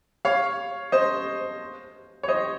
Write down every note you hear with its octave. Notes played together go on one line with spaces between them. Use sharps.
C#5 F5
C5 D#5
C#5
C5 D#5